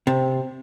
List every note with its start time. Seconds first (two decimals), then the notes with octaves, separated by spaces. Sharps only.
0.07 C3